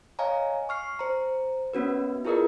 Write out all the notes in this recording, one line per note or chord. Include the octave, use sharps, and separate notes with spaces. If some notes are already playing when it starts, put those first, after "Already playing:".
C#5 D#5 F5 G#5 A#5
C#6 F6 C7
C5 A#5
A#3 B3 C#4 F#4 B4
E4 F4 G#4 A#4 B4 D#5